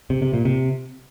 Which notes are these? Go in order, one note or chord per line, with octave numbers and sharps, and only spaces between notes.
C3
C3
A#2
C3